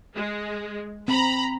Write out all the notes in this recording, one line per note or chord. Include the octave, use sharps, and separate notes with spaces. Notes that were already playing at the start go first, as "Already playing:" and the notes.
G#3
C4 A#5 B5